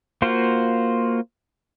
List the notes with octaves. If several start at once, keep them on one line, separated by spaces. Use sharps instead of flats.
A#3 F4 F#4 C5